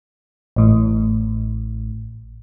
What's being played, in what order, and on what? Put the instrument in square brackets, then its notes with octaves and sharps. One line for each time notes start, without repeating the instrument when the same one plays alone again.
[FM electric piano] A1 A2